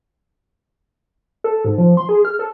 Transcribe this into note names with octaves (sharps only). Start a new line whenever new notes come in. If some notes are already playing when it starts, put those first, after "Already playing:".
A4
G#2
F3
C6
G#4
F6
A4